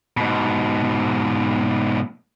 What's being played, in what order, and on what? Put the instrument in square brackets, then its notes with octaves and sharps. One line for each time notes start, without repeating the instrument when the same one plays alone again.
[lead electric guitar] G#2 B2